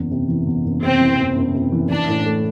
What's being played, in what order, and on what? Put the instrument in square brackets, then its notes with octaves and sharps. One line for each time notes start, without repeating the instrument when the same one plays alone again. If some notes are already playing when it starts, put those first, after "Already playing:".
Already playing: [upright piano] F#1 E2
C3
E3
E2
F#1
[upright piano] C3 [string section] C4
[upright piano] E3
E2
F#1
C3
E3
[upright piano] E3 [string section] D4
[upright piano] A2
A3